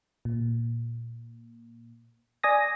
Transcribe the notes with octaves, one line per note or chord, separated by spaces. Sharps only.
A#2
D5 G#5 D#6 A#6